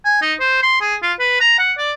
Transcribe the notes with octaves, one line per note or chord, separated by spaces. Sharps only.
G#5
D#4
C5
C6
G#4
F4
B4
A#5
F#5
D5